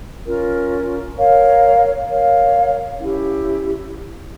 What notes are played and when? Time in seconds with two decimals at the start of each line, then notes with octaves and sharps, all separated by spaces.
0.26 C#4 F4 A#4
1.16 A#4 C#5 F5
2.07 A#4 C#5 F5
2.97 C#4 E4 G4